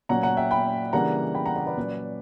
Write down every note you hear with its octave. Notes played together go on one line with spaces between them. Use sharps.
A#2 F#3 C#4 F#5 A#5
F#5 A#5
E5 G5
G5 B5
C#3 E3 G3 A#3 D4 F#5 A#5
G5 B5
F#5 A#5
D5 F#5
B4 D5
A#2 F#3 C#4